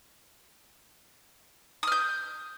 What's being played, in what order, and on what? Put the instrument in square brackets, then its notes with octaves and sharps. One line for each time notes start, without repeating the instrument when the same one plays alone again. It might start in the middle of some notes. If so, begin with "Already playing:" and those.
[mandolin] D#6
F6
G6